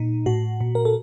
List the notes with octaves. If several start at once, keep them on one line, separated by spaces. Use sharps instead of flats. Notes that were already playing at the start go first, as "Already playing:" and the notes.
Already playing: A#2 D#4
A2 F#4
A#2
A#4
A4